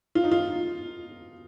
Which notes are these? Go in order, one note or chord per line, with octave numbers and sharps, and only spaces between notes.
F4
D#4
F4